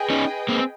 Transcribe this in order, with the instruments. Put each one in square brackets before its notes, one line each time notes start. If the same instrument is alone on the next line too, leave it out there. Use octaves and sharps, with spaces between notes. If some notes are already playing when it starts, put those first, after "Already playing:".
Already playing: [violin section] G#4 B4 D#5 G5
[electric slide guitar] C#4 D#4
A#3 C4